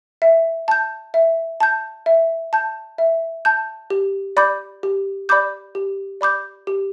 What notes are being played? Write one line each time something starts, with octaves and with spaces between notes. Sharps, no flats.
E5
A5 G6
E5
A5 G6
E5
A5 G6
E5
A5 G6
G4
D5 B5 D6 G6
G4
D5 B5 D6 G6
G4
D5 B5 D6 G6
G4